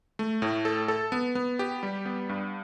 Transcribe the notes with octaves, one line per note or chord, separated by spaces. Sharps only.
A3
A2
A4
A4
B3
B3
G4
G3
B3
G2